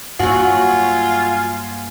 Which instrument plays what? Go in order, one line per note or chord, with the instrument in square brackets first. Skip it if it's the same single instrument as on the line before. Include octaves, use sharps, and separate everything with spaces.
[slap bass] G2 A#3 [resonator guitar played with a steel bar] F#3 F#4 [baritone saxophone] F4 [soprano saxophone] G#5